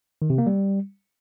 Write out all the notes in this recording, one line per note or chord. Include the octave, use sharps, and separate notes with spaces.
D#3
C3
A#3
G3